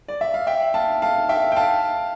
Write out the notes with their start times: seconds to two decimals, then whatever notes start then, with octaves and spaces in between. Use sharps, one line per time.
0.08 D5
0.21 E5
0.34 F5
0.47 E5 G5
0.74 F5 A5
1.02 F5 A5
1.29 E5 G5
1.52 G5
1.56 F5 A5